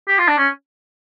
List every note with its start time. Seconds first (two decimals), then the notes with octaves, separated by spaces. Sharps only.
0.08 G4
0.19 F4
0.28 D4
0.38 C#4